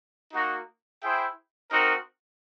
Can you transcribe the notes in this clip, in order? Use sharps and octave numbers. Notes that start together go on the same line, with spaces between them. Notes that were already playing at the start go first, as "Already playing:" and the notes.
A#3 D#4 F#4
E4 G#4 C5 E5 G5
C4 D#4 F#4 A#4